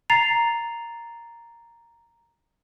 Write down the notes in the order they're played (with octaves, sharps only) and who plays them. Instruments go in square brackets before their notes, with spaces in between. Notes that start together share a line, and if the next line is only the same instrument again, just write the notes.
[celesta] A#5 A6 C7 F7